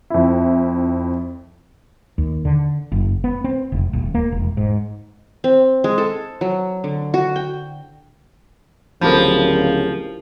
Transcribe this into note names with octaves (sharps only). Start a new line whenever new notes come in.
F2 E4
D#2
D3
F#1
B3
C4
F1
D#1
A#3
E1
G#2
C4
G#3
A4
F#3
D3
F#4
G5
D1 C#3 F3 E4 G4 A#4